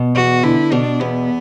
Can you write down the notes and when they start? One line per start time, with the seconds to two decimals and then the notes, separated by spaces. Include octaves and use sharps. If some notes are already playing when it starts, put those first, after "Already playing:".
Already playing: B2
0.15 E2 F#4
0.43 D3 E4
0.72 B2 D4
1.00 E2 B3